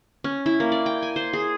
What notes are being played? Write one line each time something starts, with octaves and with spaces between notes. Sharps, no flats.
C#4
E4
A#3
D5
G5
G#5
C5
G#4